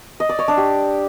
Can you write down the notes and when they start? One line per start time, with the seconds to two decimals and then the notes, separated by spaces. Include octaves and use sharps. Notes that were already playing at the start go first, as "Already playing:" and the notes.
0.20 D#5
0.29 D5
0.39 C#5
0.48 D4
0.57 G4